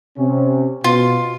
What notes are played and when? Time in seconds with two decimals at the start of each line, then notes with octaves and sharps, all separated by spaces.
0.18 C3 C#4
0.84 B2 F4